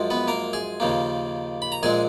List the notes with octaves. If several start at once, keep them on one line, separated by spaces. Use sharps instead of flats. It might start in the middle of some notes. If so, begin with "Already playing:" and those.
Already playing: F#2 F3 G#3
B3 B4
A#3 A#4
G#4 G#5
D#2 C#3 F3 A#3
B5
A#5
A#1 A#2 G#3 G#4 G#5